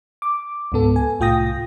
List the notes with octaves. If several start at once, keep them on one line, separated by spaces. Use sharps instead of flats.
D6
C#2 G#2 B3 A4
G#5
C2 A2 F4 G5 D#6 A#6